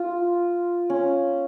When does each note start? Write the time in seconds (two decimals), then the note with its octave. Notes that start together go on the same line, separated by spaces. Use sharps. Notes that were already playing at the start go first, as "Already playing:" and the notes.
Already playing: F4
0.90 C#4